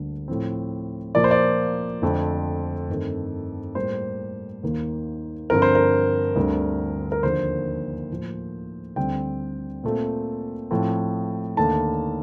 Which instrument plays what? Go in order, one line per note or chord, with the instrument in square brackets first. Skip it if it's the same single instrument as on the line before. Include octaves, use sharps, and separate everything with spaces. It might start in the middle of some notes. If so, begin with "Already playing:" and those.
Already playing: [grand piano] D2 D3 G3 A#3
A2 F3 C4
A#2 F3 A#3 D5
C5
D5
F2 D3 A3 C4
G2 D#3 A3 C4
A2 G3 A#3 C5
D#2 D#3 A#3
G2 D3 F3 C4 A#4
C5
A#4
D2 D3 G3 C4
A#4
D#2 D3 F3 A#3 C5
A2 F3 A#3
D2 D3 G3 C4 G5
A#2 A3 C4
A2 F3 C4
D#2 D3 A3 A5